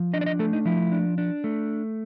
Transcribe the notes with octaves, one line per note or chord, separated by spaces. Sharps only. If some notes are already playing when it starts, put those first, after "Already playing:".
Already playing: F3
D4 D#5
D5
D#5
A3 A4
D#4
F3 E4
D4
D4
A3